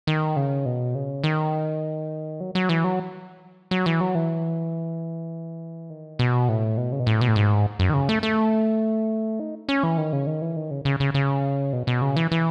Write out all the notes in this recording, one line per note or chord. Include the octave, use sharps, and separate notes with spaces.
D#3
C#3
B2
C#3
D#3
F#3
F#3
E3
F#3
F#3
E3
F#3
E3
D#3
B2
A2
B2
C#3
B2
A2
B2
A2
G#2
F#2
D#3
C#3
A3
A3
D#4
C#4
E3
D#3
C#3
D#3
E3
D#3
C#3
C#3
C#3
C#3
B2
B2
C#3
E3
E3